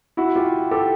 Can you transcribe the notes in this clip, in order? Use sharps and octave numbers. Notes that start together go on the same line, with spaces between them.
E4 F#4
F4 G4
G4 A4